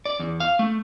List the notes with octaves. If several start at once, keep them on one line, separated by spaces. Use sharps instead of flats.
D5
E2
F5
A3